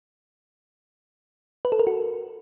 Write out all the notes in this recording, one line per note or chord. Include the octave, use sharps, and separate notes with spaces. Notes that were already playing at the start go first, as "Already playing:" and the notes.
B4
A4
A#4
F#4